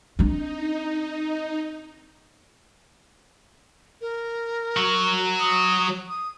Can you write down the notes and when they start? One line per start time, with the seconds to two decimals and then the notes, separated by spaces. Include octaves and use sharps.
0.19 C4 D4 D#4
4.01 A#4
4.77 F#3 F#4
5.40 D#6
6.09 D#6